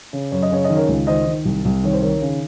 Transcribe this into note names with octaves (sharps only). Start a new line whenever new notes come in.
C#3
F#2 C#5
D#5
C#3 C#5
D#5
D#3
A#4 C#5
C#2
D#3 C5 D#5
D#3
C2
C2
D#3 C#5
C5
D#3 A#4 C#5
C#3